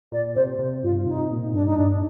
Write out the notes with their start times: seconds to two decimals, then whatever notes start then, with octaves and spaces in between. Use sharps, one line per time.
0.12 A#2 D5
0.35 C3 C5
0.59 C3
0.83 G2 F4
1.06 C3 D#4
1.31 A#2
1.53 G2 D4
1.66 D#4
1.77 G2 D4